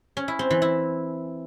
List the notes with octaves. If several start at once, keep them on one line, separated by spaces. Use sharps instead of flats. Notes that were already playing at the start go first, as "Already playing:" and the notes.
C#4
E4
C4
E3
E4